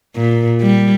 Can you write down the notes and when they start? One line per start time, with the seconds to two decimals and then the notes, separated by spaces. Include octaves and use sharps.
0.16 A#2
0.61 G3